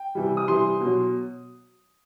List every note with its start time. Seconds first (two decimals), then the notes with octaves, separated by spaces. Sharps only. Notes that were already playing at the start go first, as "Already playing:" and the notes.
Already playing: G5
0.15 C3 E3 G3
0.37 D#6
0.48 C3 E3 G3 C6
0.81 B2
0.86 F#3